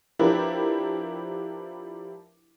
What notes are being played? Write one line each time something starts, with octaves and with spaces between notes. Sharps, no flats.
F3 D4 E4 G4 A#4 B4